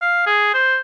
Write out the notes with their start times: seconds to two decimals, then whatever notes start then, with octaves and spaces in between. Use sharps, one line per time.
0.02 F5
0.27 G#4
0.54 C5